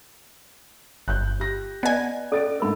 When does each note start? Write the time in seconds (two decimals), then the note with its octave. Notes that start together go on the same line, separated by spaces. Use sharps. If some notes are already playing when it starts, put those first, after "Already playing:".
1.08 G1 F#6 G6
1.40 G4 A#6
1.83 B3 D5 D#5 G#5 F#6
2.32 C#4 A4 D5 A6 D7
2.60 G#2 A3 D4 A#4 B5